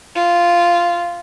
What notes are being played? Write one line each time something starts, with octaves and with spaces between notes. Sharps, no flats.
F4